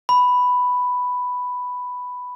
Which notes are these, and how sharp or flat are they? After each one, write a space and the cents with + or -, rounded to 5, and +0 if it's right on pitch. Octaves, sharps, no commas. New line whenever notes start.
B5 +5